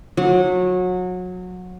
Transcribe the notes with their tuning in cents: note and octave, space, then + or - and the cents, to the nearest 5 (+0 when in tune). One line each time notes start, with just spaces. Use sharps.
F#3 -25